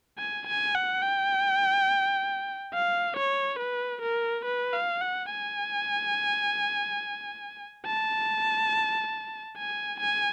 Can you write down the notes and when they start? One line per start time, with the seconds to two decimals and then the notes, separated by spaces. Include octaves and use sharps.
0.18 G#5
0.47 G#5
0.75 F#5
1.03 G5
2.74 F5
3.17 C#5
3.59 B4
4.02 A#4
4.45 B4
4.73 F5
5.02 F#5
5.31 G#5
7.86 A5
9.57 G#5
10.00 G#5